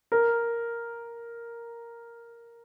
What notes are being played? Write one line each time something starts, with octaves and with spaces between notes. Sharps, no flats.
A#4